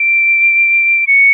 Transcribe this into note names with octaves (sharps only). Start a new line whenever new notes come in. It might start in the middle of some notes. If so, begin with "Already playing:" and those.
Already playing: D7
C#7